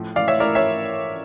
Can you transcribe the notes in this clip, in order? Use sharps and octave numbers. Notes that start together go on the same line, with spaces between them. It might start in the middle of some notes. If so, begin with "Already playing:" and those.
Already playing: A2 F3
E3 D5 F5
C#5 E5
E4 A#4 D5
C#5 E5